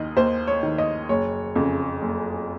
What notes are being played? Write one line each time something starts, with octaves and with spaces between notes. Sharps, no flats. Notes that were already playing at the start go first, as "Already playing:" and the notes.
Already playing: D#2 D#3 D#5
D#2 C5
C#5
D#3
D#5
F#1 C#5
F2 C#3
F#1